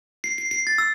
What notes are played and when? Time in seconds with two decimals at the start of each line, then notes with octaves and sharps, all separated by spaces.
0.24 C7
0.38 C7
0.51 C7
0.67 A6
0.78 E6